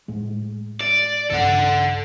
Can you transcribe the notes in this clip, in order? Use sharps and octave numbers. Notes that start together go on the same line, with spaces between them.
A2 G#3
D5
B1 G2 C#3 A4 F#5